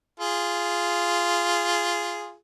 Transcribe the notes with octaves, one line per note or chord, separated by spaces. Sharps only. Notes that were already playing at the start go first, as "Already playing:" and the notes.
F4 G#4